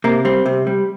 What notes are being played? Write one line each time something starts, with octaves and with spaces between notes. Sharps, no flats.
C3 A#3
G3 C4
C3
G3